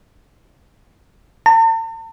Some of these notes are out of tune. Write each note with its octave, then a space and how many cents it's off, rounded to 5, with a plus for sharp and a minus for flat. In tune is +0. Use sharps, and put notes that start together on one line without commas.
A5 +45